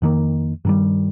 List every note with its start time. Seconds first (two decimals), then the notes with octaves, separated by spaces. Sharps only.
0.02 F2 D#3 A#3
0.65 G2 D#3 G3